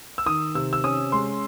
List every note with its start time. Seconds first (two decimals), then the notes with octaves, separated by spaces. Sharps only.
0.18 E6
0.26 D#3 D#6
0.55 C3 E6
0.73 E6
0.84 C#4 D#6
1.12 G#3 C6